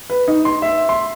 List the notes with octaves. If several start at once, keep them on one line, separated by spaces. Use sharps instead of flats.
B4
D#4
C6
E5
C6